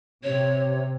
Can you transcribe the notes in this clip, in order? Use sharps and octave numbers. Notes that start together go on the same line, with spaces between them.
C3 C#5